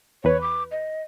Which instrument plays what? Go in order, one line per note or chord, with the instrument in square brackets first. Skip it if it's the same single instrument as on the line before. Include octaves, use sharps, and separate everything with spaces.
[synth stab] E2 B4 [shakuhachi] C#5
[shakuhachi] D6
D#5